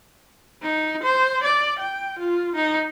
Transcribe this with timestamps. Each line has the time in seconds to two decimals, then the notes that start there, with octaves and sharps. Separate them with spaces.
0.62 D#4
1.03 C5
1.43 D5
1.79 G5
2.19 F4
2.55 D#4